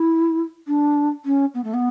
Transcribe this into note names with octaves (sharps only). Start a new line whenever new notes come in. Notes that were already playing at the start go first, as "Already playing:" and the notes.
Already playing: E4
D4
C#4
B3
A3
B3